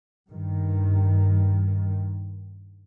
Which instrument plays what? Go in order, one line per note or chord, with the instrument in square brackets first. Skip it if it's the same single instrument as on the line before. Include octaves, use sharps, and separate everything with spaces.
[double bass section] G2 D#3